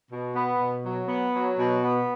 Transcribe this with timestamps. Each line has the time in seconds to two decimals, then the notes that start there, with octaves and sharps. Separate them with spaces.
0.11 B2
0.36 B3
0.59 B2
0.85 F#3
1.08 B3
1.34 F#3
1.58 B2
1.83 B3